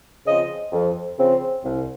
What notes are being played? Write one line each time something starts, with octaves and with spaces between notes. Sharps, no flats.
C#3 F3 C4 D#5
F2
C#3 F3 C4
C2